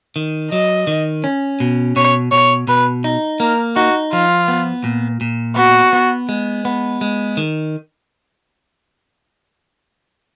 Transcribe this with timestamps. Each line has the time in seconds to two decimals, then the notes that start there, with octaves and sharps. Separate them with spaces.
0.16 D#3
0.51 F#3 D#5
0.87 D#3
1.24 C#4
1.60 B2
1.96 B2 C#5
2.31 B2 C#5
2.68 B2 B4
3.04 D#4
3.40 A#3 A#4
3.76 D#4 F#4
4.13 F3 F4
4.48 B3
4.84 A#2
5.21 A#2
5.56 B3 F#4
5.93 B3
6.29 G#3
6.65 B3
7.01 G#3
7.37 D#3